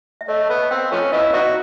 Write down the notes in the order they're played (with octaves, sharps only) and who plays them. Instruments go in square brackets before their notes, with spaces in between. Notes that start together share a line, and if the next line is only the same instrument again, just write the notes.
[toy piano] E5
[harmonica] A3 [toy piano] C#5 D#5
[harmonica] B3
[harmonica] C4 [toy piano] F5 G5
[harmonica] F3 A3 C#4
[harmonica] B3 C#4 E4 [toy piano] D#5 F5
[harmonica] B3 D#4 F#4 [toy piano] D5 E5